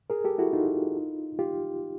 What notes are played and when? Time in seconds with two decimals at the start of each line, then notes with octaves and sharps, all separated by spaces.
0.10 G#4 A#4
0.24 G4 A4
0.38 E4 F#4
0.53 D#4 F4
1.39 F4 G4